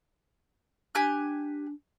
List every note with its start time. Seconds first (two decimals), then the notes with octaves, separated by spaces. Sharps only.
0.95 D4 G4 G#5 F#6